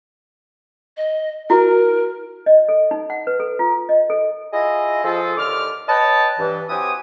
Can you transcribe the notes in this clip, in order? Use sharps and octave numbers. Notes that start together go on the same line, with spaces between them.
D#5
E4 F#4 A#4
D#5
A4
D#4
F#5
B4
A4
F4
D#5
A4
E4 F4 G#4 D#5
F3 G#4 A4
D#2 D3 D6 F6
B4 C#5 D#5 G5 A5
G2 E3
E3 F#3 C4 G4 G#5 D#6